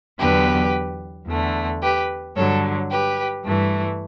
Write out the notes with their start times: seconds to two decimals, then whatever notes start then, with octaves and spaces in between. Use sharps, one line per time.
0.19 E2 D3 F#3 B3 G4 B4
1.27 E2 D3 A3
1.82 G4 B4
2.36 G2 D3 F#3 A4 C#5
2.90 G4 B4
3.44 G2 E3 A3